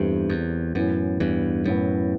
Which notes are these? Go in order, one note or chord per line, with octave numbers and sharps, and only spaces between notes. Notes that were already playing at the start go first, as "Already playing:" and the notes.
Already playing: E2 G2 G3 C4 E4 A4
E2
F#2 A2 E3 B3
E2 G2
F#2 A2 E3 B3